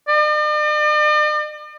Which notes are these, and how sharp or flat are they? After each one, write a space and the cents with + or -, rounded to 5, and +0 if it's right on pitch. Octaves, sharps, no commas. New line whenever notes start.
D5 +45